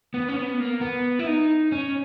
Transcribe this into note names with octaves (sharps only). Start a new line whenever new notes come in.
B3
C#4
B3
A#3
B3
E4
D#4
C#4